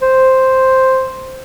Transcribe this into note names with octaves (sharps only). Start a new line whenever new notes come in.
C5